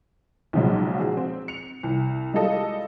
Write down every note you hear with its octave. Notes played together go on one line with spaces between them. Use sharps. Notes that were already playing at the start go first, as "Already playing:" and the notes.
B1 A#2 C#3 F3 F#3 G#3
F3 F#4 G#4
C4
C#7 F7
C2
G3 G#3 F4 G4 A4 D#5